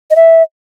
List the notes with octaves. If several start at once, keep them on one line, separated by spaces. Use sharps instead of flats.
D#5
E5